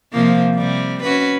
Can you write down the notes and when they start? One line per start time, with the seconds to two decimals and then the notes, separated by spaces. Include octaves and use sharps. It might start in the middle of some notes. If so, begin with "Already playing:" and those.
0.13 C3 F3 A#3
0.55 C3 G3
1.03 C#4 F#4 B4